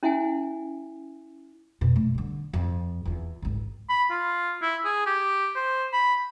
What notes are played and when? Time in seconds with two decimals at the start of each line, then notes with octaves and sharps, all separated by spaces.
0.03 C#4 E4 E5 F#5 G#5
1.81 F2 B2
1.96 A3
2.15 D3 G3
2.53 F2
3.05 E2 F4
3.42 G#1 C#2
3.90 B5
4.11 F4
4.62 E4
4.85 G#4
5.07 G4
5.56 C5
5.93 B5